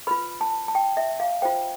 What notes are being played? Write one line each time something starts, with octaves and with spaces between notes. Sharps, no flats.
F4 B4 B5
A5
A5
G5
E5
F5
F4 C5 G5